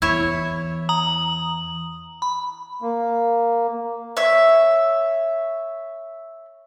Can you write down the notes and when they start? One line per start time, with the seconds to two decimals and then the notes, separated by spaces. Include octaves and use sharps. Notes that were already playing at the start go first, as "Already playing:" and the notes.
0.02 E2 E4 C#5 E5
0.89 A#5 D#6 F#7
2.22 B5
2.82 A#3
4.17 C#5 E5